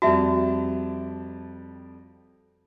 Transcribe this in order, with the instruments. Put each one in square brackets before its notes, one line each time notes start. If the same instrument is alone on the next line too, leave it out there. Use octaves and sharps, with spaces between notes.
[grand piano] F2 G3 A5 [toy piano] F#4 E5